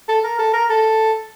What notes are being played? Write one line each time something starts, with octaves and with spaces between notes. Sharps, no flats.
A4
A#4
A4
A#4
A4